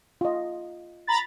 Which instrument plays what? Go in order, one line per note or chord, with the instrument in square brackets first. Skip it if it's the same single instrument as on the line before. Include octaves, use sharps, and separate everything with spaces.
[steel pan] F4 D#5
[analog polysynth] A#5 B5 A6